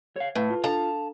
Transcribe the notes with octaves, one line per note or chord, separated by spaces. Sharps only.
C#5 F5
A2 A3 B4 F5
F4
D4 A4 F5 A5 A#5